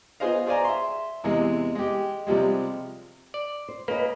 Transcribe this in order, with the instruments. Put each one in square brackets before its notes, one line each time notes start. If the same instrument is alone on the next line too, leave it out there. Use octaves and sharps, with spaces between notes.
[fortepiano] B3 F4 G#4 C5 D#5 F5
G#4 C5 D5 F5 G#5 A#5
E5 C6
E2 C3 E3 G#3
G#3 G4
C3 F3 G3 G#3
[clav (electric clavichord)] D5
[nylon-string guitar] C5
[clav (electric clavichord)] A#3 [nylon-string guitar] G#4 C#5 D#5 [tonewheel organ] B4